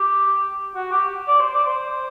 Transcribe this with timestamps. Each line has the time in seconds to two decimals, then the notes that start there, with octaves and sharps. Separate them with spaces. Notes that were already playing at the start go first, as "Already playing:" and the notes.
Already playing: G4
0.75 F#4
0.92 G4
1.28 D5
1.40 C5
1.54 D5
1.67 C5